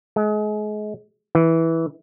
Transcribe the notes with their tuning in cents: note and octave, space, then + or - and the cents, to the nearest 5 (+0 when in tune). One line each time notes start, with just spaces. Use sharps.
G#3 +30
E3 -10